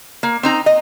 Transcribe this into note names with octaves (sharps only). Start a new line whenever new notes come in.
A#3
C4 D#4 A#5
D#5